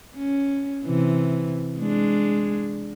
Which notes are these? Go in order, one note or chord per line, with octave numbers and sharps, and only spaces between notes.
C#4
C3 E3
G#3 D4